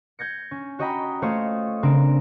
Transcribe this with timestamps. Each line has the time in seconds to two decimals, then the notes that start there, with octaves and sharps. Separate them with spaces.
0.19 G6 G#6 A#6 C#7
0.51 C#4
0.79 F#4 C#5 D#5 G5 A#5 B5
1.22 A3 F4 C5 C#5 D#5 F5
1.83 C#3 C4 D4 A#4 D7